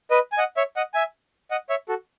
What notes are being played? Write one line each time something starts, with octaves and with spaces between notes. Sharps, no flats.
B4 D#5
G#5
D#5 F#5
C#5 E5
D#5 F#5
E5 G#5
D#5 F#5
C#5 E5
F#4 A4